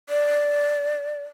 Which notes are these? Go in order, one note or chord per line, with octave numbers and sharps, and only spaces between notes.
D5